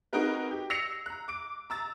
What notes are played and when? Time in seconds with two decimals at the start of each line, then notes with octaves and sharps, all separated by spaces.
0.13 C4 D#4 F#4 G#4 A#4 B4
0.51 G4
0.70 E6 A#6 C7 C#7 F7
1.06 A#5 F#6
1.28 D6 D7
1.70 A#5 E6 A6